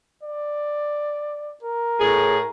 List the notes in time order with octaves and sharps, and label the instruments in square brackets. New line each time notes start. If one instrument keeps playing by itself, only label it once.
[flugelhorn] D5
A#4
[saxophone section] A2 G#4